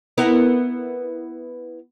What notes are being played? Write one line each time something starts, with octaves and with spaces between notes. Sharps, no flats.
B3 E4 A#4